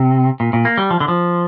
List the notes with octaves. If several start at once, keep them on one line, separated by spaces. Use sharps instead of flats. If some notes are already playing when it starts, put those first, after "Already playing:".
Already playing: C3
A#2
A#2
A#3
G3
F3
D3
F3